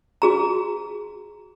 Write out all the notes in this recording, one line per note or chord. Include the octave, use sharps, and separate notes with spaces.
F#4 G#4 A#5